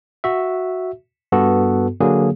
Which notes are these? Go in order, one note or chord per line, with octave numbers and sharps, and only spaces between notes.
F#4 E5
G2 B3 F#4 A4
D3 F#3 A#3 G#4